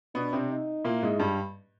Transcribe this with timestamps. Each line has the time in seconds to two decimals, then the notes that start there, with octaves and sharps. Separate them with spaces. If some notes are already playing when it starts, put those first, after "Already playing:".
0.15 B2 B3 D4
0.33 C3 C4
0.51 D#4
0.85 A#2 A#3 E4
1.03 G#2 G#3
1.19 G2 G3